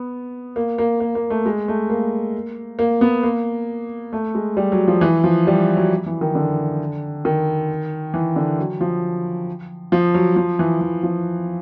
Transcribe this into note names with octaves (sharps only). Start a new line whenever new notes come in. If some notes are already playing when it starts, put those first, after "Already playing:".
Already playing: B3
A#3
A#3
A#3
A#3
A3
G#3
A3
A#3
A#3
B3
A#3
A3
G#3
G3
F#3
F3
E3
F3
G3
F#3
E3
D#3
D3
D#3
E3
D3
F#3
F3
F3
F#3
F3
E3
E3
F3